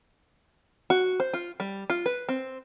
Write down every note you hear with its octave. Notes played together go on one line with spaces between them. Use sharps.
F#4
C5
F4
G3
F4
B4
C4